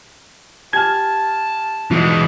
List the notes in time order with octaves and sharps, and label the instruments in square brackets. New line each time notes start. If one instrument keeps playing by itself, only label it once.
[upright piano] G4 G#5 F6 [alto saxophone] A5 [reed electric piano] G#6
[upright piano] G#2 F#3 [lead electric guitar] E3 G#3